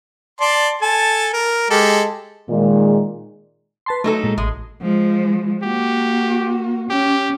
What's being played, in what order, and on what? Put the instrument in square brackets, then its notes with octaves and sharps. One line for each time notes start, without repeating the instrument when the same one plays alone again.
[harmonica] D5 A5 C6
A4 G#5 A5
A#4
G#3 G4 A4
[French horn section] A#2 D#3 G#3
[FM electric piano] B4 A5 C6
[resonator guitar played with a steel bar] F#3 D#4 A4 [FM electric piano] A3
[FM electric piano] A#2 G#3
[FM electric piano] A1 [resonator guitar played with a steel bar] G#3
[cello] F3 G#3
[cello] A#3 F#4 [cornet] G4
[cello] C#4 [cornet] G4